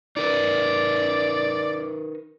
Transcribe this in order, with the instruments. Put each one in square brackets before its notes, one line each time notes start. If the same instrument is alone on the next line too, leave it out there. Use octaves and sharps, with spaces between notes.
[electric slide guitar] D#4 A#4 B4 [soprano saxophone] D5